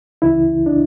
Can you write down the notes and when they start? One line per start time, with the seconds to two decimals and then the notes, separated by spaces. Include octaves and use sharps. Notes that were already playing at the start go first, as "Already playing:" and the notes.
0.22 C#2 C#3 E3 E4
0.66 D4